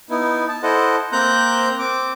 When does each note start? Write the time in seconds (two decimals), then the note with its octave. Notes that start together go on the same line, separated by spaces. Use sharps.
0.10 B3 D#4 E4
0.48 A5
0.63 E4 A4 C5 D#5 F#5
1.12 A#3 C4 C5 A#5 F#6 G6
1.79 C4 D6